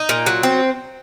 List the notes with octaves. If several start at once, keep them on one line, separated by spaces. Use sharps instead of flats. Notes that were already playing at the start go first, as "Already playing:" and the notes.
Already playing: D#4
A#2
F#3
C4